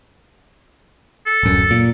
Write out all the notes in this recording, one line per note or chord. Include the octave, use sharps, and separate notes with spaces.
A4
D1 F#2
A#2